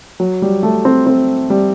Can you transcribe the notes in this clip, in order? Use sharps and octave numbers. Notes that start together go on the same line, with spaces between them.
F#3
G3
A3
C4
C4
G3